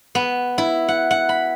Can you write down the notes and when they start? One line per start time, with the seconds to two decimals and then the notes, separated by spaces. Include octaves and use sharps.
0.15 B3
0.58 E4
0.88 F#5
1.11 F#5
1.29 B5